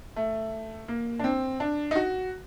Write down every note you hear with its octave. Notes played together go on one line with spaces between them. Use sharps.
A3
A#3
D4
C4
D4
D#4
F#4